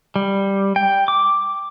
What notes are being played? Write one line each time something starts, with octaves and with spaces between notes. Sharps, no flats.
G3
G5
D6